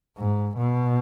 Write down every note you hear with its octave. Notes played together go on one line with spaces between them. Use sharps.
G#2
B2